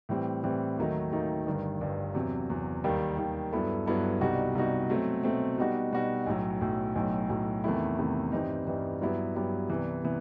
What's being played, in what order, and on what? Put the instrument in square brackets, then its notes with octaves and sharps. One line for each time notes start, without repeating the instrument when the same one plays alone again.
[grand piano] A2 E3 G3 C4
A2 E3 G3 C4
D#2 D#3 F#3 A3 D#4
D#2 D#3 F#3 A3 D#4
G1 G2 D#3
G1 G2 D#3
E2 C3 F#3
E2 C3 F#3
D#2 D#3 G3
D#2 D#3 G3
G2 F#3 B3 E4 A4
G2 F#3 B3 E4 A4
C2 B2 G3 D#4 F#4
C2 B2 G3 D#4 F#4
B2 F#3 A3 C4
B2 F#3 A3 C4
B2 G3 D#4 F#4
B2 G3 D#4 F#4
B1 A2 F#3
B1 A2 F#3
B1 A2 F#3
B1 A2 F#3
E2 C3 D#3 A3 E4
E2 C3 D#3 A3 E4
G2 E3 G3 C4 D#4
G2 E3 G3 C4 D#4
G2 F#3 B3 E4 G4
G2 F#3 B3 E4 G4
C2 C3 E3 B3
C3 E3 B3